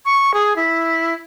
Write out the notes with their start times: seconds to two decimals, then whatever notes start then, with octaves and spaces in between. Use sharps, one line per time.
0.05 C#6
0.34 G#4
0.56 E4